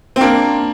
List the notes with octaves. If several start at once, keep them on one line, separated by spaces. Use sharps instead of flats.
C4
A#3 D4